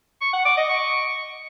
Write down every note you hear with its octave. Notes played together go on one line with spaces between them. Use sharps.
C#6
F#5
D6
D#5
C#6